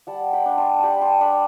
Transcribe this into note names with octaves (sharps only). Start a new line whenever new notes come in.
G3 F#5 A5
G5 B5
D4
A5 C6
G3 G5 A5 B5
A5 C6
D4 G5 B5